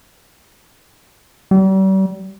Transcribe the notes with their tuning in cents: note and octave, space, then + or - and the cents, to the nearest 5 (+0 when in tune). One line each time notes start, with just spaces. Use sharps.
G3 -40